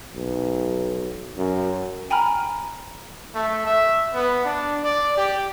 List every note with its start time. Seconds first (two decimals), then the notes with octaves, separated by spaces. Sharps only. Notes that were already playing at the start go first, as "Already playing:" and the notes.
0.15 B1
1.37 F#2
2.10 G5 G#5 A#5 B5 F6
3.35 A3
3.66 E5
4.14 B3
4.45 D4
4.83 D5
5.18 G4